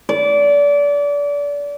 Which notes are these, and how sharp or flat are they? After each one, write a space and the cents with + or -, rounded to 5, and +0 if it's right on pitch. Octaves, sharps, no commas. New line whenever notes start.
D5 -30